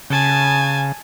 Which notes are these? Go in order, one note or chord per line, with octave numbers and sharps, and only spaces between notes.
C#3 G#5 A5